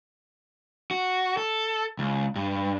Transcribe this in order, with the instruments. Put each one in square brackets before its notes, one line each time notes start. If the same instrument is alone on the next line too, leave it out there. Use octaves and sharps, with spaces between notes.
[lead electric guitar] F#4
A4
C#2
G2